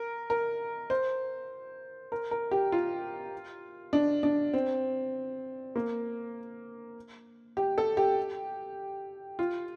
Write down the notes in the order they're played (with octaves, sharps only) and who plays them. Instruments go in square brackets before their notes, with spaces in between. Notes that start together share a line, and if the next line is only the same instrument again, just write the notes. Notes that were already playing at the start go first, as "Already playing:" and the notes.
Already playing: [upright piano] A#4
A#4
C5
A#4
A#4
G4
F4
D4
D4
C4
A#3
G4
A4
G4
F4